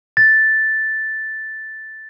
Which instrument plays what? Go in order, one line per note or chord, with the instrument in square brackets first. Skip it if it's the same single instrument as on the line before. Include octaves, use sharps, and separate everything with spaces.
[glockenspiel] A6